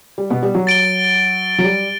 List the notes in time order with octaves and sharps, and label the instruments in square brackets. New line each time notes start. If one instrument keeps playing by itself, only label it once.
[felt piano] G3
B2 B3
G3
F#3
[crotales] A6 D7 G7
[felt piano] F#3
G3